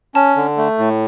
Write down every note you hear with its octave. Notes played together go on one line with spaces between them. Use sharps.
C#4 A5
D3
A3
A2